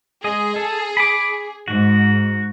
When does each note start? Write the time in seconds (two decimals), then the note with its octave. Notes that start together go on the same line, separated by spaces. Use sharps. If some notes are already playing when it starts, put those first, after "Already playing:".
0.24 G#3 G#4 D#5
0.56 A4
0.97 B5 D6
1.68 G#2 F#4